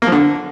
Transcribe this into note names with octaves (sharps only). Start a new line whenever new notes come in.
A#3
F3
D3